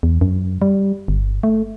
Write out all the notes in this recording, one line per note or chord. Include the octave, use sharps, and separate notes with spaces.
E2
F#2
G3
G1
A3